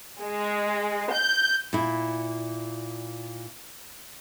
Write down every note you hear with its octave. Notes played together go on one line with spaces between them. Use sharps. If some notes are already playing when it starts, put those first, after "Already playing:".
G#3
G6
A#2 E4